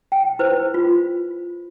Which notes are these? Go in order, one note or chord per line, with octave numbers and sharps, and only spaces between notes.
G5
E4 B4 C5
F4